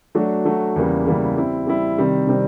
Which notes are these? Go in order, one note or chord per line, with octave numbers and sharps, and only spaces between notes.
F#3 A3 D4 F#4
F#3 A3 D4 F#4
E2 C#3 E3 G3 A#3
E2 C#3 E3 G3 A#3
G3 C4 E4
G3 C4 E4
C3 D#3 G3 C4
C3 D#3 G3 C4